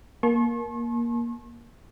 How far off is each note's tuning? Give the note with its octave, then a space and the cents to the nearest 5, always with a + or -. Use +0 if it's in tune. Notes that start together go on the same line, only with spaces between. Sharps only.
A#3 +15 A5 -40 C#6 -45